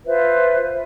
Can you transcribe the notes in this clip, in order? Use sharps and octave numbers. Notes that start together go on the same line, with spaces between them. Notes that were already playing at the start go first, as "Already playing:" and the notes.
F4 B4 C5 E5